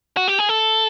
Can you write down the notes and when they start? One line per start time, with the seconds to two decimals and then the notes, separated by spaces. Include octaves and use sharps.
0.17 F#4
0.28 G4
0.39 G#4
0.49 A4